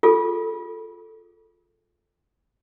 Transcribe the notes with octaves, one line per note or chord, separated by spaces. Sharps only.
F4 G#4 A4